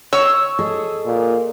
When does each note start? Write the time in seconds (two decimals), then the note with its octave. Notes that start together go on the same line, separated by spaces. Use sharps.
0.13 C#5 E6
0.59 G#4 A4 D#5
1.06 A#2